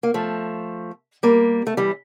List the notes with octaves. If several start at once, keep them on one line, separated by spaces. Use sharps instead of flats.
A#3
F3 A3
G3 A#3
A3
E3 G3